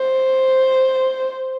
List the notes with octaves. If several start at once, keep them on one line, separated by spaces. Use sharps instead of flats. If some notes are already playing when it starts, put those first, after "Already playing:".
Already playing: C5